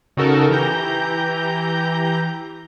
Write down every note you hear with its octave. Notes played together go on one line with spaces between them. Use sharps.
C#3 D#4 F#4 A4 A#4
E3 G4 A#5 G6